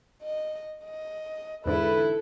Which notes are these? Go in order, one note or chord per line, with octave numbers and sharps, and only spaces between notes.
D#5
D#5
E2 G#2 D3 E4 A4 B4